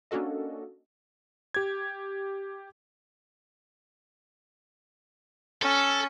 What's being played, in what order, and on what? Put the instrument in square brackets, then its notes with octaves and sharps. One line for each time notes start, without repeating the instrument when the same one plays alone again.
[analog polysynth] A#3 C#4 D4 F#4 A4 D#5
[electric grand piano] G4 G#6
[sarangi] C#4 [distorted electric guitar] A4